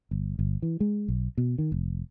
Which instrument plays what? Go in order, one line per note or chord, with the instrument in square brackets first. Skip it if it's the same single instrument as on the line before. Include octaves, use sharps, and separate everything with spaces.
[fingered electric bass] G1
G1
E3
G#3
B1
B2
D#3
F1